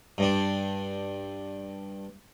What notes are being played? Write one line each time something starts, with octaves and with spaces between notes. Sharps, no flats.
G2 D4